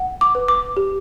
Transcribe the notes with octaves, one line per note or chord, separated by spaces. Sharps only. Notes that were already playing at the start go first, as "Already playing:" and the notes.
Already playing: F#5
D6
B4
D6
G4